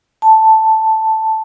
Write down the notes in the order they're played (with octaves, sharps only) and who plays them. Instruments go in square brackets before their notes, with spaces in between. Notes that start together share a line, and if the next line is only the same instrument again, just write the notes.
[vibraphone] A5